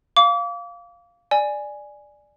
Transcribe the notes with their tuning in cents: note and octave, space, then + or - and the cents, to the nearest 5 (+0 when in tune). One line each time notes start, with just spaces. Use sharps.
F5 +0 D6 -35
D5 +10 G#5 +0